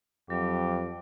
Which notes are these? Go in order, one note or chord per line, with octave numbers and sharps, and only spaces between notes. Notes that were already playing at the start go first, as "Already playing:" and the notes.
F2 F#3 G4